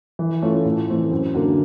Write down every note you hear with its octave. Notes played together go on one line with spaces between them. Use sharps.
E3
A3 C#4 F4 A4
A2
E3 A3 C4
F#2
D3 F#3 A#3